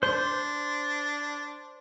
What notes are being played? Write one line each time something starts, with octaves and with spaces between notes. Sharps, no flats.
D4 C5 C6